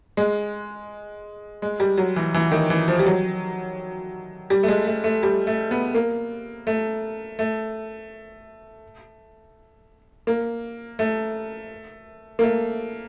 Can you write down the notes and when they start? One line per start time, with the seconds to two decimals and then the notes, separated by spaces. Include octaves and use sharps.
0.17 G#3
1.62 G#3
1.80 G3
1.98 F#3
2.16 E3
2.34 E3
2.52 D#3
2.70 E3
2.88 F3
2.99 G3
3.06 F#3
4.50 G3
4.63 A3
4.68 G#3
4.87 A3
5.04 A3
5.23 G3
5.47 A3
5.71 B3
5.95 A#3
6.67 A3
7.39 A3
10.27 A#3
10.99 A3
12.39 A#3
12.43 A3